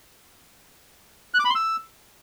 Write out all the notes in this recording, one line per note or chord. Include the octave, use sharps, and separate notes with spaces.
F#6
D6
B5
C6
E6